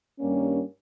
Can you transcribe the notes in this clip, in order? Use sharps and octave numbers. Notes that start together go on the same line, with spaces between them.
G2 D#3 G3 A#3 C#4